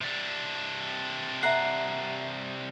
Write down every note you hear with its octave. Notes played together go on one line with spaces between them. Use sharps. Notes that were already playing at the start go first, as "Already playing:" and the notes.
C3 D4
E5 F#5 A#5 C7